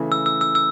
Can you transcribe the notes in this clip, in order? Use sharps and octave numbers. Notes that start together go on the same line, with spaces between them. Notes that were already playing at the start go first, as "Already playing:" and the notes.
Already playing: C#3 E3 A3 E4
E6
E6
E6
E6